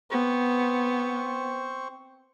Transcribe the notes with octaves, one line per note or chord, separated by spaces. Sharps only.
B3 C4 C5 C#6